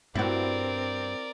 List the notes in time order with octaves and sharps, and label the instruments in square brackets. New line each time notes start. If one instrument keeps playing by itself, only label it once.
[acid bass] G2 [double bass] C4 [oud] E4 F#4 [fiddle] A#4 D5